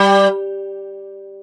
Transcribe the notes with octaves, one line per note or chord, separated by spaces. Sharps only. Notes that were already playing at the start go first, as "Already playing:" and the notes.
Already playing: G3